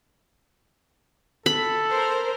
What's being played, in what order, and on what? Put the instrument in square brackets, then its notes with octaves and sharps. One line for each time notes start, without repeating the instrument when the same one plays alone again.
[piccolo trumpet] A4 [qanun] B5
[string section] A#4 C5